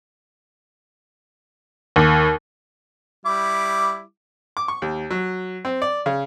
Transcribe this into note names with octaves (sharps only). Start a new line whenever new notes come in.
D#2
G3 E4 D6
D6
C#6
D#2
F#3
C4
D5
C#3